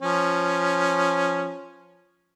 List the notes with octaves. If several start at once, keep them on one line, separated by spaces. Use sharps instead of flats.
F3 C#4